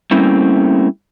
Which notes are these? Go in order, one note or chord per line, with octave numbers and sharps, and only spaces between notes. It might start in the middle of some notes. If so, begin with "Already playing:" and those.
G3 A3 A#3 C4 C#4 E4